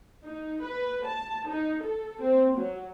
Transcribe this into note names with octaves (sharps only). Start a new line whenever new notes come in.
D#4
B4
A5
D#4
A4
C4
F#3